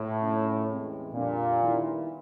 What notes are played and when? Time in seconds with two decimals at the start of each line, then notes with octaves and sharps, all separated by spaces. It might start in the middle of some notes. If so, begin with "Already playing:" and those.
Already playing: A2
0.19 C3 F3 A#3 C#4
0.67 E2 C3 E3 G#3 C4
1.14 F2 A#2 D3 G3 A#3 D4
1.62 D#3 G3 B3 E4